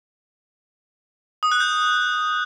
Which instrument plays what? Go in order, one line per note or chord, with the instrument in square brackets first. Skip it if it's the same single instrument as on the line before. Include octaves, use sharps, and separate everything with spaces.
[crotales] D#6
F#6
G6